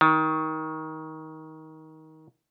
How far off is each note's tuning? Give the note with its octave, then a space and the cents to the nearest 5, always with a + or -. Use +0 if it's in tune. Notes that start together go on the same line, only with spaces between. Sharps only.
D#3 +20